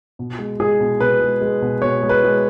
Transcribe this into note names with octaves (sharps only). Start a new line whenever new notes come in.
B2
G#3
G#3 G#4
B2
B2 B4
G#3
G#3
B2
B2 C#5
G#3
B4
G#3